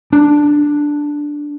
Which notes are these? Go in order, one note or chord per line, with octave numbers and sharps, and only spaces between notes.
D4